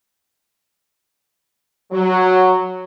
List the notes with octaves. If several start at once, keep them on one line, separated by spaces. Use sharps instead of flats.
F#3